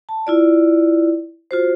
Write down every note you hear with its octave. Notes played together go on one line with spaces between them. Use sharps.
A5
E4 F4 D5
F4 F#4 C5